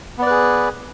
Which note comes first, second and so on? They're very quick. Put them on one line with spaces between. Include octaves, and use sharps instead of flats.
B3 D5 B4 G#4